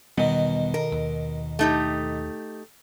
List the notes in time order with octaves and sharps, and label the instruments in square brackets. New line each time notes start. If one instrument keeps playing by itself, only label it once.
[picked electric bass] E1 G3 B3 [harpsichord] B2 D#3
[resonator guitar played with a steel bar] A#4
[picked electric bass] D#2
[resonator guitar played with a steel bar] A3 D#4 G4